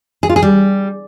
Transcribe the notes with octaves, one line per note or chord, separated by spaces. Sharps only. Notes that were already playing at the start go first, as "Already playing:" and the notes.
G#4
F4
G#4
G3